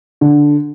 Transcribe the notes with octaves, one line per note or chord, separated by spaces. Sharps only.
D3